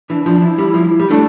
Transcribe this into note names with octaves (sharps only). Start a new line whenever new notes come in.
E3 D4
F3 D4
E4
G3
F3
G3
A3 D4